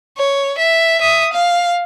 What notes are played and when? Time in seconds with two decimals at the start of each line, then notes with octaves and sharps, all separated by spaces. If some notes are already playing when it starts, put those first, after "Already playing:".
0.17 C#5
0.58 E5
1.01 E5 D#6
1.33 F5